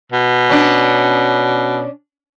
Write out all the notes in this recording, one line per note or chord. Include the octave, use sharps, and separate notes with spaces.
B2
C#4 D4